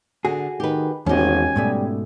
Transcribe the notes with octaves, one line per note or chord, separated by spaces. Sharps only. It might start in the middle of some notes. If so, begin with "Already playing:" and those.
D3 F#4 G#4
D#3 G4 B4
G#1 E2 C#4 F#4 G4 G#5
G#2 B2 G3 A3